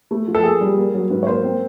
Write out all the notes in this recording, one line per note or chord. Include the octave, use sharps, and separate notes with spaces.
A3
F3
A4
A#3 G#4
G3
A#3
F#3
G#2 B4
C#5
A#3 C5
C4